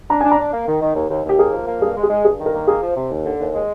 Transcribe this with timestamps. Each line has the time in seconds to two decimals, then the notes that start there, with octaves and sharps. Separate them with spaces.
0.10 D4 A#5
0.21 G#5
0.24 D4
0.31 A#5
0.38 D4
0.53 A#3
0.68 D#3
0.82 D#3
0.95 D#2
1.10 D#2
1.25 D#2 G4
1.39 A#3 G#4
1.53 F3
1.68 A#3
1.81 G2 G#4
1.97 G#3
2.03 G#4
2.10 G#3
2.25 G2 G#4
2.39 D#3
2.46 A#4
2.54 A#3
2.67 A#3 G#4
2.82 F3
2.96 C3
3.10 D#2
3.25 D3
3.39 D#2
3.54 G#3